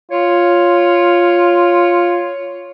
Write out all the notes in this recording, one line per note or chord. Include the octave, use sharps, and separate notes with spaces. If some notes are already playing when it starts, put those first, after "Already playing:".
F4 C#5